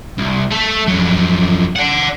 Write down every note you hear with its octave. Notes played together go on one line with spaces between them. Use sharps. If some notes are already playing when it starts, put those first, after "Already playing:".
C2
A3 A4
F2 F#3
D5 F#5